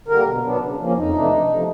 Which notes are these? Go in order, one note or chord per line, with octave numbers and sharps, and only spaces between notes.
D3 G3 A#3 A#4
B2
F#3 B3 D4
C#3
F3 A#3 C#4
F2 D#4
C3 E3 A3 D4
F2
C3 F3 A3 D4